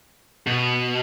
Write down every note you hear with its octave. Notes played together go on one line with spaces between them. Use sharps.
B2